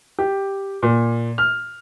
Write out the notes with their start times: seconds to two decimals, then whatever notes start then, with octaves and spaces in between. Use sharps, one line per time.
0.19 G4
0.83 A#2
1.38 F6